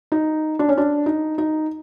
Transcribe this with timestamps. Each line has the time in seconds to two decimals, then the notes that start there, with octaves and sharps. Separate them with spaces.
0.12 D#4
0.59 D4
0.69 C#4
0.78 D4
1.06 D#4
1.38 D#4